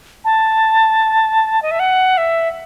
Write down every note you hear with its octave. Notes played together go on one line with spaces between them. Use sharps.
A5
D#5
E5
F#5
E5